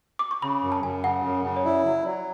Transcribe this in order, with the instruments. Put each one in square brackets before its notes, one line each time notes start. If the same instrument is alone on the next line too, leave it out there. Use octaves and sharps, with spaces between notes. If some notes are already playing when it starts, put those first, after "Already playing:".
[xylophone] D6
C#6
[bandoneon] C#3 [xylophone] B5
[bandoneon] F#2
[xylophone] A5
[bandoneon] F#2 [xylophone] G#5
[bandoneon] C#3 [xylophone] F#5
[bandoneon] F#2
[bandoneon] C#3 [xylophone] F#5
[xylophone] C#5
[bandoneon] E4 [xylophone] D5
[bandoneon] F#3
[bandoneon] F#3 [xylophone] D5